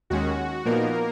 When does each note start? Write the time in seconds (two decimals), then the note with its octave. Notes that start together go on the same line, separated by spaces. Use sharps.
0.10 D#2 D#3 G#3 C#4 F#4
0.65 A#2 F3 A#3 B3 D#4 A#4